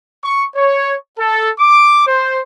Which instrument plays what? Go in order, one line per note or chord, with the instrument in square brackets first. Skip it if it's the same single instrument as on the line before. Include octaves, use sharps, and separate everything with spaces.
[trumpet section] C#6
C#5
A4
D6
C5